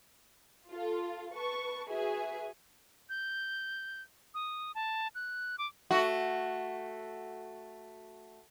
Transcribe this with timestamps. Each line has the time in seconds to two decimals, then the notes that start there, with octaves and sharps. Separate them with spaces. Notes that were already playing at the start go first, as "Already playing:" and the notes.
0.70 F4 A4
1.34 B4 A5 C#6
1.90 F#4 G#4 B4 E5 G#5
3.09 G6
4.34 D#6
4.75 A5
5.15 F#6
5.58 D6
5.91 A3 F#4